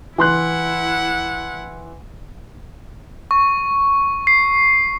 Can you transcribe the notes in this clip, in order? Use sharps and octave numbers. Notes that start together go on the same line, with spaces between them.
E3 E4 F#5 C6 F#6
C#6
C7